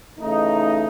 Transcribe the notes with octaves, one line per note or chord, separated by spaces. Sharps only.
C#3 E3 A3 D#4